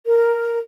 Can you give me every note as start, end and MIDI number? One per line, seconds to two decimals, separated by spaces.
0.06 0.58 70